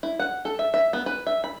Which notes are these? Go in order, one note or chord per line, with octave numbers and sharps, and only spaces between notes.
E4
F#5
A4
E5
E5
B3
B4
E5
B5